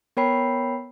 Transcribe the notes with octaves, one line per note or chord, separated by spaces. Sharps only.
B3 A#4 C#5 G5 B5 C7